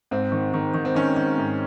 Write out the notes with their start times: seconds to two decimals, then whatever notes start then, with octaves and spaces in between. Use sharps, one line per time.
0.11 G#2 C4
0.32 D#3
0.54 D#3
0.74 D#3
0.85 C4
0.95 D#3 C#4
1.16 D#3
1.38 G#2